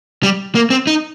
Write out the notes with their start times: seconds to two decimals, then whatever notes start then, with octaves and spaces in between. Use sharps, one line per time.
0.23 G3
0.55 A#3
0.70 C4
0.87 D#4